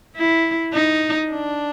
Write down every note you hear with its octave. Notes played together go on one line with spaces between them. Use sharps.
E4
D#4
D4